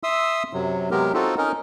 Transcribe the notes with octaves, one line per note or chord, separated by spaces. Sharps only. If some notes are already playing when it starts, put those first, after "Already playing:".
E5 C6 D#6 E6
F#2 C3 F#3
C3 F#3 G#3 B3 G4 A#4
C4 D#4 F4 F#4 A4
C#4 D#4 A#4 D#5